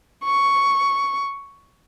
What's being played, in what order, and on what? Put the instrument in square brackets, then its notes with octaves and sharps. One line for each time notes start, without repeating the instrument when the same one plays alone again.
[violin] C#6